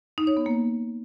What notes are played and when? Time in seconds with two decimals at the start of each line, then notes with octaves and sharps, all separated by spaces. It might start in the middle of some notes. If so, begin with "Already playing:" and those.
0.18 D#4
0.27 C#5
0.37 B3
0.46 A#3